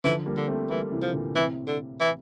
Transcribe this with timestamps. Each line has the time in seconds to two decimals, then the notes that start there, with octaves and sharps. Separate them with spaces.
0.04 D3 E3 F3
0.26 G3 A#3
0.37 D3
0.48 A3 C4
0.69 E3 G3 A#3
0.92 C3 E3
1.02 F3
1.13 A#2 D3
1.34 A2 C3 E3
1.67 D3
2.00 E3